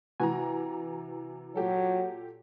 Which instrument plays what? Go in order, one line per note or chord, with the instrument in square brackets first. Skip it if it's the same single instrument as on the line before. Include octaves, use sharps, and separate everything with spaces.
[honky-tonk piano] C3 E3 A#5 [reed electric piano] F#4 B4 G#5
[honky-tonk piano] A#2 G4 A4 [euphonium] F#3